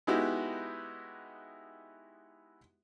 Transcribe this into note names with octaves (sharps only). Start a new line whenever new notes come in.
G#3 B3 D#4 E4 F#4 G4